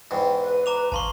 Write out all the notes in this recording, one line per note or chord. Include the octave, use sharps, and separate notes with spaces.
E2 G#2 G5
B4
A#5 D6 F7
A1 F5 A5 C6 C#6